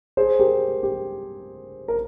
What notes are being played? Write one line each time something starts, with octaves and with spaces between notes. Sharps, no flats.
G#4 C5
G4 A#4
G4
A#4